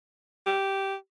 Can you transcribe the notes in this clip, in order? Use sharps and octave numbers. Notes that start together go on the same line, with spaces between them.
G4